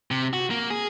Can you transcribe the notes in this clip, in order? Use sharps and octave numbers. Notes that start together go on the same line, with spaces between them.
C3
F#4
A#3
G#4